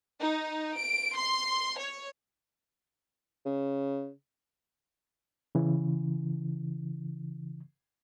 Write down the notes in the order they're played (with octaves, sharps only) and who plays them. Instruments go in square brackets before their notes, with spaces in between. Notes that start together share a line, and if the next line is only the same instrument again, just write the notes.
[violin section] D#4
D7
C6
C#5
[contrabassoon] C#3
[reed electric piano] C#3 E3